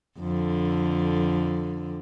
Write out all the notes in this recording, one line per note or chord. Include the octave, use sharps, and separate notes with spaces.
F2 D3